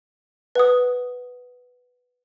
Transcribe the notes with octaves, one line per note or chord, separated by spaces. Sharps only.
B4 F#5 D#6